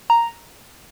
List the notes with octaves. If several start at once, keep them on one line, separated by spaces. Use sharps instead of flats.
A#5